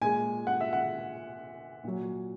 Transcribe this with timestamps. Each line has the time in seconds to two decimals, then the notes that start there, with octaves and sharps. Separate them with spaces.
0.01 A#2 G#3 G#5
0.47 F#5
0.61 E5
0.73 F#5
1.84 A#2 F#3